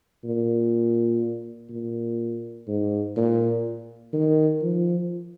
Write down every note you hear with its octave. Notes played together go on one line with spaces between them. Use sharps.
A#2
A#2
G#2
A#2
D#3
F3